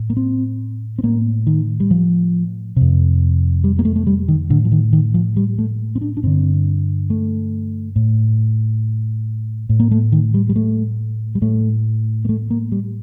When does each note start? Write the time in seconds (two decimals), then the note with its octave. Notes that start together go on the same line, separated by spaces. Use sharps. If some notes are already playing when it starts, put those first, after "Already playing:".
Already playing: A2
0.10 A#3
0.17 C4
0.99 C4
1.03 A2 A#3
1.47 D#3
1.80 G3
1.91 F3
2.76 F2 C3
3.64 G3
3.79 A#3
3.85 A3
3.96 A3
4.07 G3
4.28 D#3
4.50 A2 D3
4.65 F3
4.72 D#3
4.93 D#3
5.14 F3
5.37 G3
5.58 A3
5.96 C4
6.01 D4
6.17 D4
6.23 G2 D3 C4
7.10 A3
7.96 A2
9.69 A2
9.80 A#3
9.91 A3
10.12 D#3
10.34 G3
10.49 G3
10.56 A3
11.35 G3
11.42 A2 A3
12.25 A#3
12.29 A3
12.50 A#3
12.72 G3